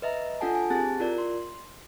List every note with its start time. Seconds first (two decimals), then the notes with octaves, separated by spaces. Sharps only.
0.02 B4 D#5 E5 A#5
0.41 D4 F4 A4 F#5 G#5 A5
0.55 G#5
0.70 C4 G4 G#4 A5 F#6 A6
0.99 E4 F4 A#4 D5
1.18 C6